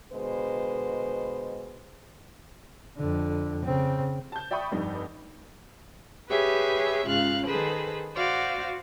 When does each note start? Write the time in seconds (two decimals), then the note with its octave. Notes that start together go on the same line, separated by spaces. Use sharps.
0.12 B2 D3 G#3 B4 C5
2.97 F2 D3
3.65 C#3 C4
4.32 A5 G6
4.51 D5 E5 G5 B5 C#6 D#6
4.71 F1 G2 D#4
6.29 G4 G#4 B4 C#5 E5
7.06 G#2 C#3 F4 F5 F#6
7.47 D#3 G#4 A4 B4 C5
8.16 F#4 C5 D5 F5